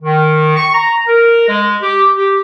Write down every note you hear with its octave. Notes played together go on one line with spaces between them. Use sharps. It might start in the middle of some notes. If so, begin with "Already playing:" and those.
D#3
C#6
A#5
A#4
G#3
G4
G4